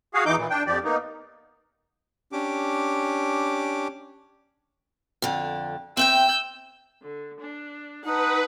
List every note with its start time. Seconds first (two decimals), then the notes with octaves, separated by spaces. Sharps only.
0.14 F#4 G#4 F5
0.26 E2 E3 D#4 D6 G6
0.37 A#2 E3
0.50 D4 G5
0.67 F2 F3 G4 D5
0.84 A#3 B3 D#4
2.32 C#4 D4 G4 D6
5.22 F2 D3
5.97 C4 E5 G5 E6 G6
7.00 D3
7.39 D4
8.04 D#4 B4 F#5 A5